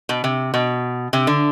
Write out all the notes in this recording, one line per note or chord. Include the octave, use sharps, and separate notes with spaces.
B2
C3
B2
C3
D3